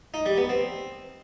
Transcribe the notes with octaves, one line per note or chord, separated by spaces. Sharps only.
D#4
G3
B3
C4